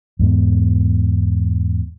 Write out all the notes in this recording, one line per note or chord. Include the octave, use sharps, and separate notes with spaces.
E2 G#2 B3